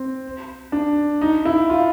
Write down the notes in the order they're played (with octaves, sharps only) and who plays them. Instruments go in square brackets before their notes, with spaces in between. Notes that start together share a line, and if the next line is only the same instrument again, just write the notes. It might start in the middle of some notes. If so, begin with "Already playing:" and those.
Already playing: [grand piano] C4
D4
D#4
E4
F4